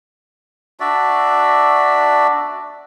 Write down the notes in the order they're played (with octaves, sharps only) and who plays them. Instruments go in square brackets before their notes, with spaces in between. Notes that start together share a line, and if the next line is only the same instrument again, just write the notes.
[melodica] D4 F#4 D5 E5